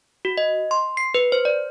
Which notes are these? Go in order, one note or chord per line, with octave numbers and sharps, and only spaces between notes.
F#4
D#5
C6
C7
B4
C5
D5